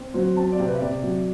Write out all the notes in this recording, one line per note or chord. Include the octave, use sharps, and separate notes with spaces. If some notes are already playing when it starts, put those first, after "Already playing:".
Already playing: C4
F#3 C5
C4 A5
D5
C3
B4
E5
C3 D5
F#3